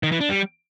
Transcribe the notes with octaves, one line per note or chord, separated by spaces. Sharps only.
D#3
E3
D4
G3